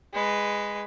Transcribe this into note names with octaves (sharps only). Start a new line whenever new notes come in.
G#3 B4